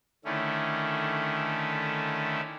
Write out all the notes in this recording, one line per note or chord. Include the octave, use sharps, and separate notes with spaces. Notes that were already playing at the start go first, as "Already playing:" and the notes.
D3 D#3 A3 C#4 E4